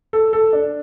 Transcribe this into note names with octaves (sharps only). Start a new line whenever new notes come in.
A4
A4
D4